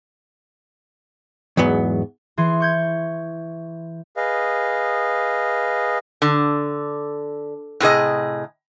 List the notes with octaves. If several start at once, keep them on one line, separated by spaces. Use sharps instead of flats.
E2 G#2 F#3 B3
E3 G#4 C6
C#6 G6 G#6
G#4 B4 D#5 F5
D3
A2 C3 G#4 D#5